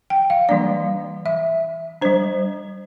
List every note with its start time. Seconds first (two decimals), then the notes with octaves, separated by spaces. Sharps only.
0.10 G5
0.30 F5
0.49 E3 G3 A#3 D4 D5
1.26 E5
2.01 G3 D4 C5